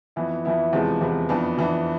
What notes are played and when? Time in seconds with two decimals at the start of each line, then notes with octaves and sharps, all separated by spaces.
0.16 F2 E3 B3 E4
0.45 F2 E3 B3 E4
0.73 E2 C3 F3 G#3 B3
1.01 E2 C3 F3 G#3 B3
1.29 F2 E3 B3 D4
1.57 F2 E3 B3 D4